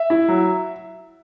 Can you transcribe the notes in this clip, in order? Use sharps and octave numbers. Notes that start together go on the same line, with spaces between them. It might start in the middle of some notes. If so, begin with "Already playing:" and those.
Already playing: E5
E4
F#3